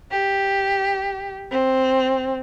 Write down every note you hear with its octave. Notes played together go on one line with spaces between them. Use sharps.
G4
C4